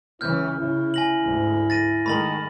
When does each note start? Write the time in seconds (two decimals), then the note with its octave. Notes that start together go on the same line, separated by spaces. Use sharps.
0.21 C#2 E3 C#4 E4 F6 G6
0.60 C#3 E4
0.94 G#5 A#6 F#7
1.22 D2 G#2
1.70 A6 A#6 D#7
2.06 D#3 G#3 A3 B5 A6 F#7